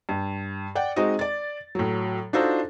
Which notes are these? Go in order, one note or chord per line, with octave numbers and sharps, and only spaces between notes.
G2
D5 F#5 G5
G#3 C4 D#4 F#4 D#5
D5 A6
A2 F#3
D4 D#4 F4 F#4 A4 C5